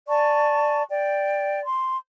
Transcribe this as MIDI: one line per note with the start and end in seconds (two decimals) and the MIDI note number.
0.08 0.83 74
0.08 0.83 80
0.08 0.83 81
0.08 0.83 85
0.89 1.62 74
0.89 1.62 79
1.65 1.97 84